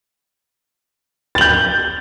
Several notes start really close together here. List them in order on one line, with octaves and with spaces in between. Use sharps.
A6 F#7 G6